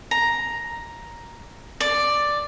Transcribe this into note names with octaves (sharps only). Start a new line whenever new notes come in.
A#5
D5